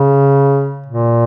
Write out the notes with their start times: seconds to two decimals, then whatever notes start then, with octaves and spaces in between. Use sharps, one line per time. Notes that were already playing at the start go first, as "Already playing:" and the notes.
Already playing: C#3
0.86 A#2